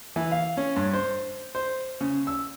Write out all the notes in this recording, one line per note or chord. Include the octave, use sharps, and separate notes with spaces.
E3
F5
C#4
G2
C5
C5
C#3
E6